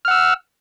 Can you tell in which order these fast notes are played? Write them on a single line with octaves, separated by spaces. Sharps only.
F6 F#5 E6